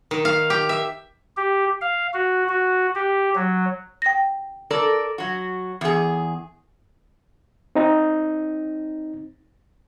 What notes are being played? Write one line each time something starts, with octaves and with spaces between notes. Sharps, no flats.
D#3
F5
G4
E5
G4
F5
F#4
F#4
G4
F#3
G5 A#6
A4 A#4 D5
F#3 F#4
E2 G#4
C4 D#4